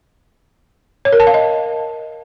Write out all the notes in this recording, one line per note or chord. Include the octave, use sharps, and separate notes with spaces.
C#5
A#4
A5
F5
D#5